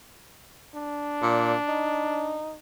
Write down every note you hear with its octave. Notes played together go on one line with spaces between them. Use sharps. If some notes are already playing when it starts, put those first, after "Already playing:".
D4
A#2
D#4